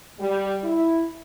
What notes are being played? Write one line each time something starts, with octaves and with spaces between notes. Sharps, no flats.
G3
E4